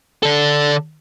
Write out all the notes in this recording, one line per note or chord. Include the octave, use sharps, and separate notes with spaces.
D3 A4